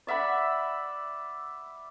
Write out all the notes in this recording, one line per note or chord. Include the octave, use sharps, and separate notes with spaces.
D5 E5 F#5 B5